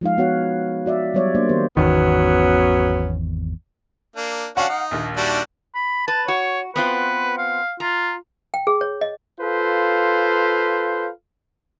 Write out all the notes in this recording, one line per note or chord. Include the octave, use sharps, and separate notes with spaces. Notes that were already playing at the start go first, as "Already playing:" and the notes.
F3 G#3 D#4 F5
B3 F#4 C#5 F#5
F#4 D5 E5
F#3 G3 B3 C#5 D5 E5
A#3 D4 C5 D5
D#3 B3 G4 C5
G#1 E2 D#3 F#3 B3 C#4
A#3 D4
C#4 D4 F#4 F5 F#5
D#4
A#1 D#2
G3 D4 F#4
B5
B4 A5
F#4 C#5
B3 C4 F4 B4
F5
F4 A#5
G5
G#4
C#5
D#5
F4 A4 B4 C5 F5